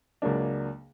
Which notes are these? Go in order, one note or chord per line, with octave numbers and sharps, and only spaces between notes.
C#2 C#3 F#3 A#3 D4